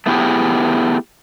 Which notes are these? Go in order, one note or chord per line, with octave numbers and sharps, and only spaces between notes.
A3 B3 E4 G4 G#4